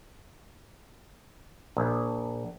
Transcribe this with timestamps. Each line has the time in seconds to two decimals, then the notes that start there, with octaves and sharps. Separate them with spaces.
1.77 A#1